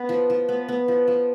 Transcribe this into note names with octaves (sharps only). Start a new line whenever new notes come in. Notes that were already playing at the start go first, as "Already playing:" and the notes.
Already playing: B3
F3
F3
B3
B3
F3
F3